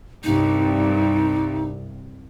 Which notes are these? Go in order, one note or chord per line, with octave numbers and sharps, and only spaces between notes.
C2 G2 D#4